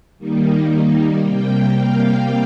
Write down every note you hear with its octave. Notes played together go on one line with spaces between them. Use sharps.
D#3 G3 A#3 D#4
C3 G3 A#3 G5
F5